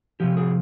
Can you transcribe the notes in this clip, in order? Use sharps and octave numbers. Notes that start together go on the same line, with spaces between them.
C3 F3 G4
G#4